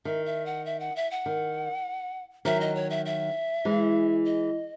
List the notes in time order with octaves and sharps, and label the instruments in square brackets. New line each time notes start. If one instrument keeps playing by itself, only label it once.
[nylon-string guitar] D#3 [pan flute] E5
[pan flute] E5
F#5
E5
F#5
E5
F#5
[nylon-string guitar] D#3
[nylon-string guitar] D#3 F#3 [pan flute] E5
[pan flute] D#5
C#5
E5
E5
[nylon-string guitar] E3 G#3
[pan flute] D#5